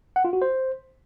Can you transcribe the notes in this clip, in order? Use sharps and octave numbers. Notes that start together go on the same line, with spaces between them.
F#5
F4
F#4
C5